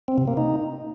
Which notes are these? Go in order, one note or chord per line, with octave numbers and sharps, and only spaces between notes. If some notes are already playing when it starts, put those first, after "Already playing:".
C4
C3
A#3
D#4